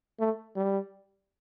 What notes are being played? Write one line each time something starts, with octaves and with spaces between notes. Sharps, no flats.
A3
G3